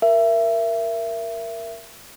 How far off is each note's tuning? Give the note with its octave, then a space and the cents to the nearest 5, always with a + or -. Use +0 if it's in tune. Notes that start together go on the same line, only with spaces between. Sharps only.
A#4 +0 E5 +25